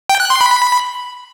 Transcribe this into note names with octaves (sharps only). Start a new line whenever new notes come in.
G5
F#6
C6
B5